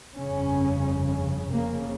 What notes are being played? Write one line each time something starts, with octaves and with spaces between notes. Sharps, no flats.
G1 F2 C#3 C#4
F1 F2 C#3 A#3